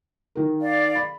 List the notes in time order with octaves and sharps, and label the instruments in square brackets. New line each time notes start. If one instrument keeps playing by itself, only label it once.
[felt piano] D#3 A#4
[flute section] D5 F5
[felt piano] B5